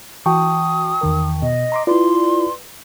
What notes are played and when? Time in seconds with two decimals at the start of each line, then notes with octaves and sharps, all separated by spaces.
0.26 E3 F#4 G5 A5 C#6 D#6
1.01 E2 D#3 A#4
1.42 B2 D#5
1.72 A#5 C6 D6
1.87 E4 F4 B4 D5 C6